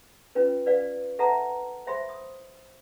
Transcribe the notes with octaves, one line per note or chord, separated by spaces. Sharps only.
C#4 F4 B4
B4 D5 F5
A4 B4 E5 F#5 A5 A#5
C5 E5 B5 C6
D#6